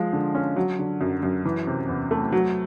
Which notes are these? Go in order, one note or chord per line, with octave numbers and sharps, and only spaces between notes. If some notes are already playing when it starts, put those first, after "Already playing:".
Already playing: F3 G#3
D3
C#4
F#3
D3
F#2
F#2
E3
C3
E2
A3
F#3